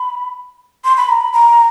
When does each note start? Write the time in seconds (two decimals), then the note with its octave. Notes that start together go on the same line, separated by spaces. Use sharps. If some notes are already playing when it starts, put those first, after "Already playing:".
Already playing: B5
0.84 C6
0.97 B5
1.09 A#5
1.20 B5
1.33 A#5